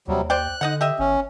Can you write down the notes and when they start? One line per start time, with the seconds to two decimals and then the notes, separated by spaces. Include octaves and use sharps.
0.08 D#2 C3 F#3 G3
0.30 C5 D5 G5 F#6
0.61 D3 D#4 D#5 F#5
0.81 G4 D#5 E5
0.99 G1 C#4